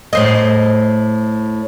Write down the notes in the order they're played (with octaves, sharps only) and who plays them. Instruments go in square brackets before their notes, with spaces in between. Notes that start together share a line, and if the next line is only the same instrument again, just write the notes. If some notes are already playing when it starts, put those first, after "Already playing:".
[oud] A2 C5 D#5